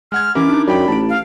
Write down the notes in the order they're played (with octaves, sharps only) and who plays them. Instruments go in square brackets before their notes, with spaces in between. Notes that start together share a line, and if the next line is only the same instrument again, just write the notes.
[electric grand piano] G#3 F#5 G#6 [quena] F6
[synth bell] E3 C#4 G4 [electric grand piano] E4 A#4 [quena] D6
[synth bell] D4 D#4
[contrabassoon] F#2 [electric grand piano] D5 G5 D6 [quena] B5
[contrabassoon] A1 [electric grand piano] A5 D7
[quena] F5